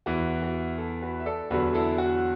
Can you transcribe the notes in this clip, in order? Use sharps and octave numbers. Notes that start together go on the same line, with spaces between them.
E2 E3 F#4
F#4
E4 A4
F#4 B4
E5
A4 D5
E2 D3 F#3 F#4 B4
E4 A4
F#4